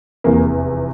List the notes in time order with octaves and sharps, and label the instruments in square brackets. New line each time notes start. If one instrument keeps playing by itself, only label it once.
[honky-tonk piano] F1 E2 C3 E3 A#3